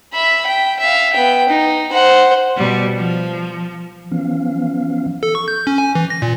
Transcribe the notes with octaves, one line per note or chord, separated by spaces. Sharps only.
E5 B5
G5
E5 F5
B3 G5
D#4
C5 F#5
B2 G3
F3
E3 F3 B3 C#4 F5
A4
C#6
G6
C#4
G#5
E3
A#6
A#2